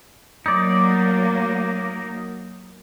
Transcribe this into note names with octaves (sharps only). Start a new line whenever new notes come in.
F#3 A#3 D#4 D5